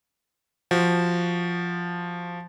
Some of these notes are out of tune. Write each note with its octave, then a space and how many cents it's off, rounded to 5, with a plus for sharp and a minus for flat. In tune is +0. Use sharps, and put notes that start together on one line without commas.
F3 +0 F#4 +10